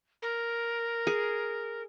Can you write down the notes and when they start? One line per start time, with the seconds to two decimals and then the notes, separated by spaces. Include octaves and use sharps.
0.22 A#4
1.07 G#4